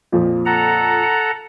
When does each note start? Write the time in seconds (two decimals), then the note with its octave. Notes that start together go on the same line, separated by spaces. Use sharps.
0.12 F2 A#2 F3
0.46 A4 F#5 A#5
1.03 C#7